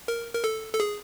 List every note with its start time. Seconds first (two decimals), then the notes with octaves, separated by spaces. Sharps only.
0.08 A#4
0.34 A#4
0.44 A4
0.74 A4
0.80 G#4